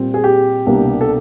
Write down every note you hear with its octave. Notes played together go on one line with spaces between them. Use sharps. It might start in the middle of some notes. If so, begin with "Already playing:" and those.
Already playing: A#2 G3 C4
G#4
G4
C2 B2 G3 A#3 D4
A4